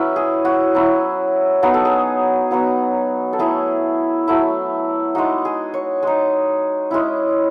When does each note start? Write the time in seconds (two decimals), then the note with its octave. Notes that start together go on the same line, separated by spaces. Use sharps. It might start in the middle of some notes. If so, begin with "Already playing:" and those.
Already playing: F#3 C#4 E4 B4
0.16 G#4
0.45 F#4
0.75 F#3 C#4 E4
1.63 F#3 B3 D#4 G#4
1.74 A4
1.85 G#4
2.51 F#3 B3 D#4
3.33 A4
3.39 F#3 A3 E4 G#4
4.28 F#3 A3 E4
5.15 G#3 D#4 F#4
5.45 G#4
5.74 C#5
6.03 G#3 D#4
6.91 G#3 C#4 E4